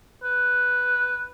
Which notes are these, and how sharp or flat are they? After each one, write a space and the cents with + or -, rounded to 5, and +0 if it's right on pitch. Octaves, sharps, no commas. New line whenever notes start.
B4 +0